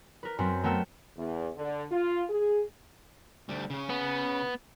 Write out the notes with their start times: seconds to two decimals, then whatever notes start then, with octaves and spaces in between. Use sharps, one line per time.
0.23 A#4 B4
0.39 F#2 C4 B4
0.64 A3 B3 A#4 G5 E6
1.18 E2
1.57 D3
1.92 F4
2.30 G#4
3.49 D2 G3
3.70 C#3 C#4
3.90 B3